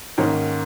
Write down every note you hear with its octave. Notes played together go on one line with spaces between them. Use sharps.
G#2 D#3 A#3 C#4